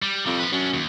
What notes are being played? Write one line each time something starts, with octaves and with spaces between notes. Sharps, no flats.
G3
F2 G3 C4
F3 B4
F#2 C#4 D4
D#2